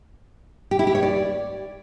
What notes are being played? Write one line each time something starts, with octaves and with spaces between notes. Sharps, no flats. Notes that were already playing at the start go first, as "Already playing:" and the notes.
G4
E4
G4
C#5
D5